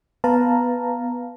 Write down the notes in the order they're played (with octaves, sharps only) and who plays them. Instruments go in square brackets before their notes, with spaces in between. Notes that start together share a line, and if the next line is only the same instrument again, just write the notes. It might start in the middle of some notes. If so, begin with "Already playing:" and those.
[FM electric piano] B3 B4 F5 A5 A#5